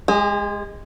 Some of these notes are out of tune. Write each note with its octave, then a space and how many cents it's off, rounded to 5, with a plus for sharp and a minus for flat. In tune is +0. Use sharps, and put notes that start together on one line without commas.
G#3 +0 G#4 -45